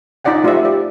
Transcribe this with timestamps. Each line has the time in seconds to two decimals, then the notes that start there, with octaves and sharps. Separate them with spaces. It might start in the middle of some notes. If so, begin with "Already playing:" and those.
0.25 D#4 F4 D5 F#5 G5
0.44 A3 F4 G4 C5 D5 E5
0.65 G4 D5